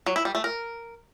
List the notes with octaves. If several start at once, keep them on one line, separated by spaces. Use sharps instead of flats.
F#3
E4
G3
A3
A#4